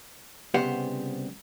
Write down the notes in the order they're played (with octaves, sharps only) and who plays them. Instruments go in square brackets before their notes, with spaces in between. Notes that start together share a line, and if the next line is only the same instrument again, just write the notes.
[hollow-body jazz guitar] C2 C#3 B3 G4 C5 F#5